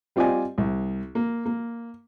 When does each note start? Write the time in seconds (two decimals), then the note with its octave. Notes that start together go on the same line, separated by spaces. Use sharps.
0.16 G3 C4 F4 D5 D#5 G#5
0.58 C2
1.15 A#3
1.46 A#3